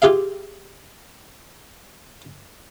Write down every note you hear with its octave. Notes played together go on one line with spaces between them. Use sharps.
F4 G4 G#4 E5 F5